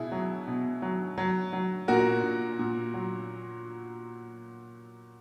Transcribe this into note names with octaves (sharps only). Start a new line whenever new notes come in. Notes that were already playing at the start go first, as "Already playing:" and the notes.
Already playing: B2 E4 G#4
F#3
B2
F#3
F#3
F#3
A#2 F#4 A#4
A#2
A#2
F#3